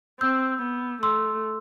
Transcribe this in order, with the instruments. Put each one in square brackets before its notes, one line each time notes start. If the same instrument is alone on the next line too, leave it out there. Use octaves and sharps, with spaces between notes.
[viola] C4 [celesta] E6 G6
[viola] B3
[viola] A3 [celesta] C6 E6